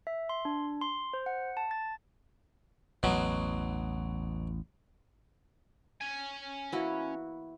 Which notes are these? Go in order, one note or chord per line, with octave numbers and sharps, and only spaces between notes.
E5
C6
D4
C6
C5
F#5
A5
A6
A1 E2 B2 F#3
C#4 G#5
E3 A#3 B3 E4 F#4